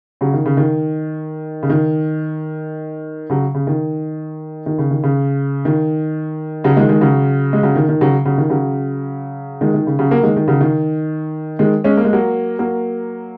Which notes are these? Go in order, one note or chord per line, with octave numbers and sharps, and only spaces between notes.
C#3 F#3
D#3
C#3
D#3
C#3
D#3
C#3 F#3
C#3
D#3
D#3
C#3
D#3
C#3
D#3
C#3 F#3
D#3 G#3
D#3 G#3
C#3 F#3
G#3
C#3 F#3
D#3
D#3
C#3 F#3
C#3 F#3
D#3
C#3 F#3
D#3 G#3
D#3
C#3
C#3 F#3
F#3 A#3
D#3 G#3
D#3
C#3 F#3
D#3
D#3 G#3
G#3 C#4
A#3
G#3
F#3 A#3
F#3 A#3